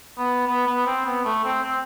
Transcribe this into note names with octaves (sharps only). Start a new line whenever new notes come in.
B3
B3
B3
C4
B3
A3
C4
C4